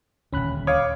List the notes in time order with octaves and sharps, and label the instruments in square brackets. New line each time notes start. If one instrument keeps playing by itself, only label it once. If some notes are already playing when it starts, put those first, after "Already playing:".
[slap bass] D#1 D2 [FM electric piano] C#4 B5 F#6
[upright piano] C#5 [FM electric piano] F5 D6 D#6